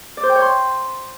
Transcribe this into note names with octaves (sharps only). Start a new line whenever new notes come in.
D5
C5
G5
C#5
C6